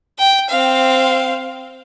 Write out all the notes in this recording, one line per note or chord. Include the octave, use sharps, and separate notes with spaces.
G5
C4 F5